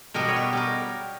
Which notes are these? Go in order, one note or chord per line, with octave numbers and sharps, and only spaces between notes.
B2 G3 B3 A#4
C#5
B4
G4 A#4